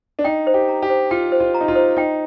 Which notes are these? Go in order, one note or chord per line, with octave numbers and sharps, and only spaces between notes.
D4
D#4 G5
C5
G4
A#5
G4
C5
F4 G5
C5
F4
A#5
D#4
F4
C5
D#4 G5